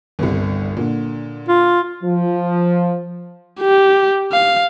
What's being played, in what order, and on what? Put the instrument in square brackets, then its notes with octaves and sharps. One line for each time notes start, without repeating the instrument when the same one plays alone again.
[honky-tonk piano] G1 C2
A#2 D3
[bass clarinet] F4
[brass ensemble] F3
[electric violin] G4
F5